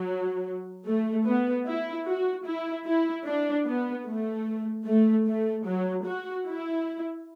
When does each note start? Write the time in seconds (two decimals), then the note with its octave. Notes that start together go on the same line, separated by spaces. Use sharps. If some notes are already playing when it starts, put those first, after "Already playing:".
Already playing: F#3
0.86 A3
1.26 B3
1.66 E4
2.06 F#4
2.46 E4
2.86 E4
3.26 D4
3.66 B3
4.06 A3
4.86 A3
5.26 A3
5.66 F#3
6.06 F#4
6.46 E4